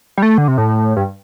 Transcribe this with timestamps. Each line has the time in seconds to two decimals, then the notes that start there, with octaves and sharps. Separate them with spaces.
0.17 G3
0.22 A3
0.38 D3
0.48 C3
0.58 A2
0.96 G2